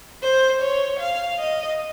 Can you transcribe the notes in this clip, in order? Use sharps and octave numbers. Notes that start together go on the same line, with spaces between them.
C5
C#5
F5
D#5